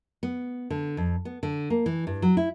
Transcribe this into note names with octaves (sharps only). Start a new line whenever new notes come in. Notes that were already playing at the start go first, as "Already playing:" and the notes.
B3
D3
F2
B3
D3
A#3
E3
G2
F#3
E4